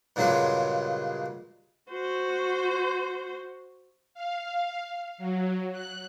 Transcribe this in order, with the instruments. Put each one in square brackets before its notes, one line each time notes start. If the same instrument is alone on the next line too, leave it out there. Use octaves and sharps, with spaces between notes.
[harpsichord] G2 A#2 C#3 F#3 G#3
[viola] F#4 C5
[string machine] F5
F#3
F#6